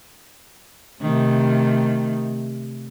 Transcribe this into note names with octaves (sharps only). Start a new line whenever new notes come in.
C3 D#3 A3